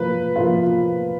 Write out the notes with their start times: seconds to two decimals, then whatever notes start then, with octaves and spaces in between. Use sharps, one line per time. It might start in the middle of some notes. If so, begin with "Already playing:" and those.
Already playing: F3 A#3 F4 B4
0.36 F3 A#3 F4